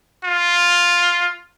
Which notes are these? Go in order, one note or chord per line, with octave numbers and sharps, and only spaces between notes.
F4